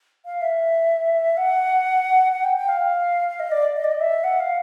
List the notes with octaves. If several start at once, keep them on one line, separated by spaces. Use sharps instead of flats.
F5
E5
F#5
F#5
G5
G5
F5
F5
D#5
D5
D#5
D5
D#5
E5
F#5
F5